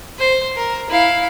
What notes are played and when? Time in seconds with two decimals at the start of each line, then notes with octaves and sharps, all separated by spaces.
0.19 C5
0.56 A#4
0.90 E4 F5